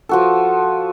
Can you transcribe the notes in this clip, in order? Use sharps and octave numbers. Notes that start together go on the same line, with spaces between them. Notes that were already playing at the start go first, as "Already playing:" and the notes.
F3 F#4 A4